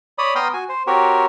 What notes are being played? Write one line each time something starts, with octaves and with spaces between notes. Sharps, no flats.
C#5 D5 B5 D#6
B3 G5 A#5 C6 D#6 F6
F#4 G#5
C5
C4 F#4 G4 A#4 C#5